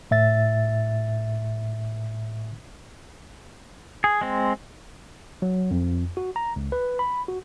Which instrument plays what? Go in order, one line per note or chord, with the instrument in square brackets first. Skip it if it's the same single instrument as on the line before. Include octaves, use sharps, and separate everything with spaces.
[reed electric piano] A2 E5 A6
[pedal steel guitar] G#4
G#3 C4
[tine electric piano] F#3
F2
F#4
A#5
C#2
B4
B5
F#4